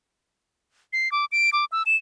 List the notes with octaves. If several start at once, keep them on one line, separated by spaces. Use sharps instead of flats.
C7
D6
D7
D6
E6
E7